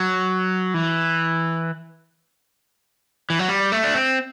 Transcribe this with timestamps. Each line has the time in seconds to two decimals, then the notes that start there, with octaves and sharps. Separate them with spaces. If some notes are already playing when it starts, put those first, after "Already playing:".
Already playing: F#3
0.74 E3
3.30 E3
3.39 F#3
3.49 G3
3.72 A3
3.84 D4
3.94 C4